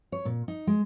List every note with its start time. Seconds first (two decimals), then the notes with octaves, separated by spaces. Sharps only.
0.12 C#5
0.25 A#2
0.48 D#4
0.67 G#3